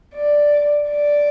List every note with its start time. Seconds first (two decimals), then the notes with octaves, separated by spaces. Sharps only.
0.16 D5
0.89 D5